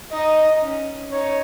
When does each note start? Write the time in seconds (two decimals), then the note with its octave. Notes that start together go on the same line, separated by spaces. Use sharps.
0.11 D#4 D#5
0.61 C#4
1.12 D#4 C#5